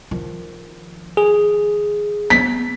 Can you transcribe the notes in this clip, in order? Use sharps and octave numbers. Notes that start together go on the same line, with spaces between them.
D#3 F3
G#4
B3 C4 B6